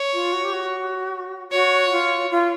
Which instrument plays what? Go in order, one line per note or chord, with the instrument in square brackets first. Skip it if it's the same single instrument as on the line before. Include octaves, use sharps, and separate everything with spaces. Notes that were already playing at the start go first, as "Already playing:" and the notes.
Already playing: [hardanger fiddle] C#5
[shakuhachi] F4
F#4
G4
F#4
[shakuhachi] F#4 [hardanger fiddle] C#5
[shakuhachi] F4
F4